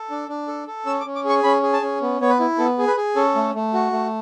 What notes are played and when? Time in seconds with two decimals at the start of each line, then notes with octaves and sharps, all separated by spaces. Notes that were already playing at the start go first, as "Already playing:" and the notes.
Already playing: A4
0.10 D4
0.29 D4
0.48 A4
0.67 A4
0.86 C#4 E6
1.00 D6
1.06 C#4
1.15 D6
1.24 G#4
1.29 C#6
1.43 C#4 B5
1.62 G#4
1.73 A5
1.82 C#4
2.01 B3
2.21 B3 C#5
2.30 B4
2.39 E4
2.58 B3 A4
2.78 G#4
2.87 B4
2.96 G#4
3.16 C#4 A4
3.35 A3
3.55 A3
3.74 F#4
3.92 A3